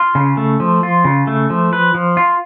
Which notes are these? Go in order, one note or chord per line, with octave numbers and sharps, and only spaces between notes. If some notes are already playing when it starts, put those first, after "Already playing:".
Already playing: F4
C#3
A3
F3
F4
C#3
A3
F3
B4
F3
F4